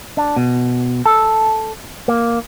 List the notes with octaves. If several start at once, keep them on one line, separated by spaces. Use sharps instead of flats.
D4
B2
A4
A#3